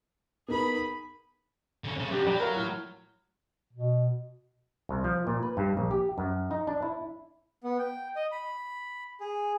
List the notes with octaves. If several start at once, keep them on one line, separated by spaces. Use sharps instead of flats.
B3 D#4 G#4 A#4 B5
D3 C#4
C#3 A3
F#2 D4 G4
F#3 D5 G5 B5
F4 A#4
A2 F6
B2
C2
F3
A#2
B4
G2
A#1
G4
F#2
D#4
D4
E4
B3
G5
D#5
B5
G#4